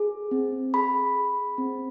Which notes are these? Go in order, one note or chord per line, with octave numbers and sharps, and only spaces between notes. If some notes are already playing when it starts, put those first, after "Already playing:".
Already playing: G#4
C4
G#4 B5
G#4
C4